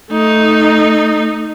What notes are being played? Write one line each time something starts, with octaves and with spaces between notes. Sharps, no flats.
A3 D#4